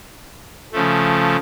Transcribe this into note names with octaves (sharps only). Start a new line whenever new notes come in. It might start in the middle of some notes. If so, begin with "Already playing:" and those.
C#3 F3 A3